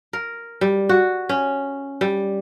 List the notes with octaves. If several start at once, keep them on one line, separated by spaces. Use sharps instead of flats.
A#4
G3
F#4
C#4
G3